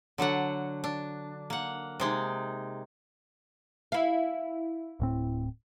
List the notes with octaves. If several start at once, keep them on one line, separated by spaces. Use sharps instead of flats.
D3 F#3 D4 F#5
D4
A#3 F#5
C3 G#3 D#4
E4 F5
D1 A2 C4